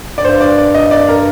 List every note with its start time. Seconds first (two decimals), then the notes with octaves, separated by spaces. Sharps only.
0.18 D5
0.24 G2 C5
0.41 D5
0.58 D5
0.74 D#5
0.91 D5
1.09 A#4